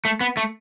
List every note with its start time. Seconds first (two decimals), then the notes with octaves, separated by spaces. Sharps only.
0.05 A3
0.21 B3
0.37 A3